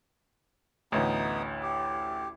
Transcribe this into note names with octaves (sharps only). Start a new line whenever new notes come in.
A1 D2 B3 D#4 D#6
G4